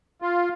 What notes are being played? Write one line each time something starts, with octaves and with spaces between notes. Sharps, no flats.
F4